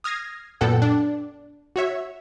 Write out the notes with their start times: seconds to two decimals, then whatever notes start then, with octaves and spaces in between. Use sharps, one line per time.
0.04 D#6 F6 G#6 A#6 C7
0.61 F#2 A#2 B3 A4 F#5 G5
0.82 D4
1.76 F#4 C#5 E5